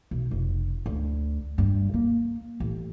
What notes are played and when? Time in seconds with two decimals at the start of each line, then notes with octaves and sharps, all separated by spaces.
0.11 B1
0.31 F1
0.86 D2
1.58 G2
1.94 A#3
2.60 A1